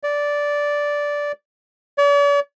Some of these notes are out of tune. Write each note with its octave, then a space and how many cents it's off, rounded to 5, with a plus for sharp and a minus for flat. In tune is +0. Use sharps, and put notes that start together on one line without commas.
D5 -10
D5 -45